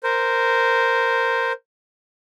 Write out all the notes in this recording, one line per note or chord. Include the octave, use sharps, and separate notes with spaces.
A#4 C5